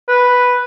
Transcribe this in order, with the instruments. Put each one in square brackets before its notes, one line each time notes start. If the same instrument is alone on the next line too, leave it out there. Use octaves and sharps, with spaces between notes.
[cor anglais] B4